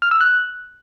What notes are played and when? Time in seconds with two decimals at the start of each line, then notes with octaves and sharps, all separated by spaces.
0.02 F6
0.11 E6
0.21 F#6